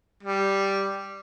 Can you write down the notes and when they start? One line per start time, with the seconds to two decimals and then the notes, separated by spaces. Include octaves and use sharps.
0.23 G3